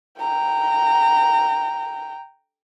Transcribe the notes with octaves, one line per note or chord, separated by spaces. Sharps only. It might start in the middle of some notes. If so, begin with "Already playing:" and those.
G5 A#5